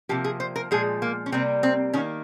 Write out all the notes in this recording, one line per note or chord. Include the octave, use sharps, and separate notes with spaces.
C3 F3 A#3 G4
G#4
C5
A#4
A#2 F3 G#3 G#4
A#3
C#4
C3 G3 A#3 C4
C4
D#3 A#3 C#4